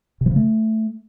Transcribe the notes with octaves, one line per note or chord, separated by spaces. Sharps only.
C3
F3
C#3
A3